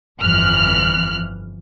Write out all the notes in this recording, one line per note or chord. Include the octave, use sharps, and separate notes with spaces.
G1 F2 E3 F3 F6 F#6